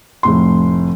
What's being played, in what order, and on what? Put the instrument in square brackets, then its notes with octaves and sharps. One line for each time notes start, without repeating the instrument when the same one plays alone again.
[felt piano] F1 A2 C6